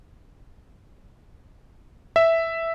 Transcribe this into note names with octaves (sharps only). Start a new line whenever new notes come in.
E5